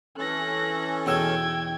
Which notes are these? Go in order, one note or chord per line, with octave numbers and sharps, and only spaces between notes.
E3 C#4 A4 F#6 A#6
E2 B2 C#5 D#5 G5 E6 G#6